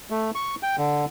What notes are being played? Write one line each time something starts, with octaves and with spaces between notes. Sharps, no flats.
A3
C#6
G5
D3